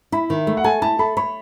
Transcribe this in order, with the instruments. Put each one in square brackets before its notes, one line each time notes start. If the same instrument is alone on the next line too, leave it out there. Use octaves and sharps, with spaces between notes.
[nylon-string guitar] E4 [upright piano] B5
[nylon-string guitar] D#3
A3
[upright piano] F#5
[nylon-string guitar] A4 [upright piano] G#5
[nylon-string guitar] E4 [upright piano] A5
[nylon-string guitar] A4 [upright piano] B5
[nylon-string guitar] C#5 [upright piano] B5